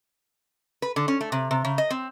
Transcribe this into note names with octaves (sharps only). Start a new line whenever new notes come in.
B4
D3
C#4
A3
C3
C3
C#3
D#5
C4